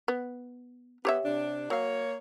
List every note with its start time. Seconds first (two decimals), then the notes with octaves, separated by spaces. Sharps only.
0.08 B3
1.05 B3 G4 C#5 E5
1.24 C3 D4
1.70 F#3 A#3 C#5 F5